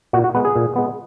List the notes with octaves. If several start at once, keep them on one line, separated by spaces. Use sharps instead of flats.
A#2 F#4
F#4
G#3 B3 B4
G#4
A#2
G#3 B3